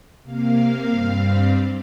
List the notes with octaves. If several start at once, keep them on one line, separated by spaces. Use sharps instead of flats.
C3 A#3 F5
G2 G3 C4